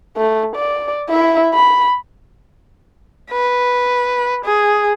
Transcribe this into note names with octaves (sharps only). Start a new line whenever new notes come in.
A3
D5
E4 E5
B5
B4
G#4